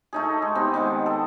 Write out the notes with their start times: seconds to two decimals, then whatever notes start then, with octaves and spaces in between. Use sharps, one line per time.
0.13 A3 D#4 G#4
0.42 G#3
0.55 B3 C4 D#4 G4
0.74 D#3 G#3 F#5 D6
1.06 A4 D#5